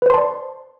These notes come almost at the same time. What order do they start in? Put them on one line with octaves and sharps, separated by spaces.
B4 C5 C6 A5 D5